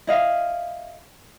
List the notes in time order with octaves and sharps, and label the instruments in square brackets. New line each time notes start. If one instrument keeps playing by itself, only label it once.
[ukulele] E4 D#5 F5